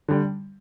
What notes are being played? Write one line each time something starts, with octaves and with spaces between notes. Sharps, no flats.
D3 G3